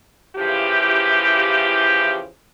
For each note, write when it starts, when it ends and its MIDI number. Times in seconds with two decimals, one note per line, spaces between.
0.36 2.26 49
0.36 2.26 52
0.36 2.26 53
0.36 2.26 64
0.36 2.26 67